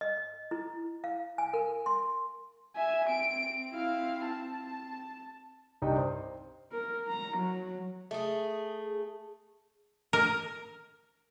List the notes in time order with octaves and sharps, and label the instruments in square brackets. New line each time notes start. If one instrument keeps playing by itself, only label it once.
[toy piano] D#5
E4
F5
G#5
A#4
C6
[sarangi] E5 [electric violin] G#5
[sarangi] C4 [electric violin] D7
[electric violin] E4 F5
A5
[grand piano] C2 G2 D#4 G5
C5
[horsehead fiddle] A#4
A#5
F#3
[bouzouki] A3 G#4
[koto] A#4